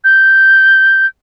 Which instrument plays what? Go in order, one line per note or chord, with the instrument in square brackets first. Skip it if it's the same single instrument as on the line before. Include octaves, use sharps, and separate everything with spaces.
[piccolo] G6